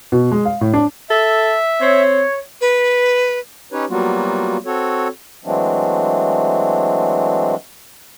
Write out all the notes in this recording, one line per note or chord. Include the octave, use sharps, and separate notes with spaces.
B2
G#3
F5
A2
D4
A4 E5
C4 C#5
B4
C#4 D#4 G4 B4 C#5
F#3 G3 A#3 B3 F4 F#4
C4 F#4 A4 C#5
E3 F#3 G#3 A3 C4 D4